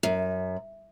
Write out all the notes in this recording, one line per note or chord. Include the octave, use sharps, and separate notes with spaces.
F#2